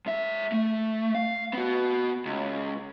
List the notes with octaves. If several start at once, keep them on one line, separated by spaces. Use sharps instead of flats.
G#2 E5
A3
F5
B3 F#4
C#2